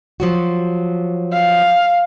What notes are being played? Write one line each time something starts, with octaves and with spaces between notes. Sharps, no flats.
F3 F#3 F#4
F5